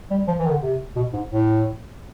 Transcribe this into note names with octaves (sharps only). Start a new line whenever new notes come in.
G3
F3
E3
D#3
D3
C3
B2
G#2
A2